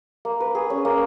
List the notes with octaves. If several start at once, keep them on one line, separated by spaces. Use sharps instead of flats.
A#3
B4
G#4
C#4
A#3